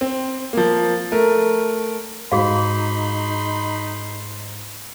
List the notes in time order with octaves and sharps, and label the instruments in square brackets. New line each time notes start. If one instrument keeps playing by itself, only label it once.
[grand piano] C4
F3 A#3
A3 A#4
[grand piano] G#2 [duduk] D#4 [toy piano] F#4 G#4 F5 [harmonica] B5 C6